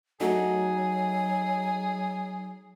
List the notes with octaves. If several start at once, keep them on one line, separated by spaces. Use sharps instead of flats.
F#3 A3 D#4 F#4 G#4